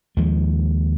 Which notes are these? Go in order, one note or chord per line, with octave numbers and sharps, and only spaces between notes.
D#2 F3 G#3